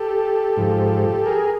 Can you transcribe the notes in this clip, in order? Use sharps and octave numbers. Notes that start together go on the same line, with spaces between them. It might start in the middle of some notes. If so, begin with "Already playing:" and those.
Already playing: G4 A4
G#2 F3
G#4 A#4